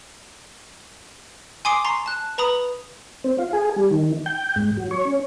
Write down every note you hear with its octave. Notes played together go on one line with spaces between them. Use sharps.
G#5 C6 D6 D#6 C7 D7
A#5 C6 C#6 C7
A5 F#6
B4 A#5 B5 D#6
C4
F4
G#4
G3
D#3
G5
G#2
F#3
C#5
C#4